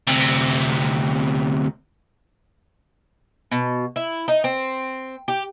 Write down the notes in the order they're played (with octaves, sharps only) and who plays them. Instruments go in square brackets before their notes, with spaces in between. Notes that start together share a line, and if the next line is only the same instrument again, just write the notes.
[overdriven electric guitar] D2 C3
[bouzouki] B2
E4
D#4
C4
G4